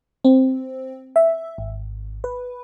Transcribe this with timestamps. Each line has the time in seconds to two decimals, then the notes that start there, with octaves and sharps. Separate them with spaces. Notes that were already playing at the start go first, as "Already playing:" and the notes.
0.25 C4
1.16 E5
1.58 G#1
2.24 B4